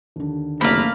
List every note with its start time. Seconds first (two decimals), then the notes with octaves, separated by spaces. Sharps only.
0.16 D#2 D3
0.61 F#1 C3 A3 A#3 F5 B5